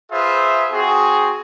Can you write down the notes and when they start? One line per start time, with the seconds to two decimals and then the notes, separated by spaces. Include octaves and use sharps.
0.11 F4 G#4 B4 C5 E5
0.72 C4 F#4 G#4